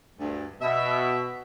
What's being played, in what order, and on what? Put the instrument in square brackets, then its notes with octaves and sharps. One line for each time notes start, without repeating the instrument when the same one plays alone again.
[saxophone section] D2 G2
[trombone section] B2 [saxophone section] E5